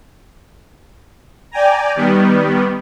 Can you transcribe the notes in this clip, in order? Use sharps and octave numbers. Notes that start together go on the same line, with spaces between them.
D5 G5 G#5 A#5
D#3 G3 B3